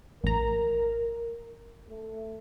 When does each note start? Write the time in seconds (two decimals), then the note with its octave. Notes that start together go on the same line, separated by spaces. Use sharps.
0.24 A1 A#4 A#5
1.89 A3